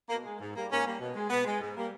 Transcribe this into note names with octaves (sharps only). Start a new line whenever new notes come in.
B2 A#3
G#3
G#2
G3 A#3
G#2 A#3 C#4
G3 A#3
B2
G#3
B2 B3
G#3
G#2
G3 A#3